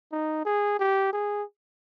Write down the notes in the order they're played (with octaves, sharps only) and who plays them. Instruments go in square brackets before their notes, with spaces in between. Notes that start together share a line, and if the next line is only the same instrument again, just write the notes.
[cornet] D#4
G#4
G4
G#4